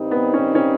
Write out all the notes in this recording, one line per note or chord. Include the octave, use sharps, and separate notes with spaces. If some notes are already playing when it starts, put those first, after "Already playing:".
Already playing: G2 D#3 G3 C4 D#4
B3
C#4
C#4